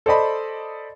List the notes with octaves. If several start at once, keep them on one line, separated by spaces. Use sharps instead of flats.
A4 C5 D5 D#5 B5